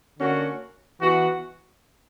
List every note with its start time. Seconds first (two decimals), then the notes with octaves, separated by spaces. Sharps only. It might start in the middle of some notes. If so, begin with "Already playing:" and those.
0.20 D3 A#3 C#4 F#4
1.00 E3 B3 F#4